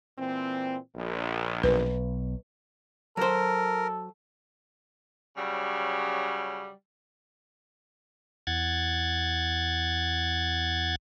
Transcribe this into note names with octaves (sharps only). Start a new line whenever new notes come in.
A#2 E3 C4
A#1
B1 B4
F#3 A4 A#4 C5
C#3 F#3 G3
E2 F#5 G#6 A6